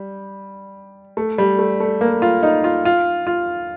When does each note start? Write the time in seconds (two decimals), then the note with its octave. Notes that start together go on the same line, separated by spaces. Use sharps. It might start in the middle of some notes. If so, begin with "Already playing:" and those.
Already playing: G3
1.17 A3
1.38 G3
1.59 A3
1.80 A3
2.01 A#3
2.22 F4
2.43 D#4
2.64 F4
2.85 F4
3.27 F4